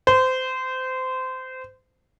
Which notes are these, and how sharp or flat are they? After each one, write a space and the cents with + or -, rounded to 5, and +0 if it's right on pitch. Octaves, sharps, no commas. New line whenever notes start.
C5 -25